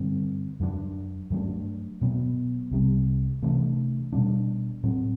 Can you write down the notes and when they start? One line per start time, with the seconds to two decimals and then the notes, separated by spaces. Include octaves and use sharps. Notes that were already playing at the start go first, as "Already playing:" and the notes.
Already playing: G2 D3 G3 C4
0.60 F#2 F#3 A3 D4
1.30 G2 F#3 A3 D4
2.01 B2 F#3 B3
2.71 C2 C3 G3
3.42 C3 E3 A3 D4
4.13 B2 G3 D4
4.83 A2 F#3 C4